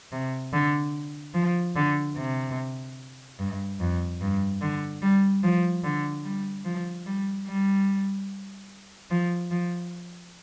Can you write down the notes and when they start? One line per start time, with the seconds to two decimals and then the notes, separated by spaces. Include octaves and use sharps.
0.12 C3
0.53 D3
1.35 F3
1.76 D3
2.17 C3
3.39 G2
3.80 F2
4.21 G2
4.62 D3
5.02 G3
5.44 F3
5.84 D3
6.24 G3
6.65 F3
7.06 G3
7.47 G3
9.11 F3
9.51 F3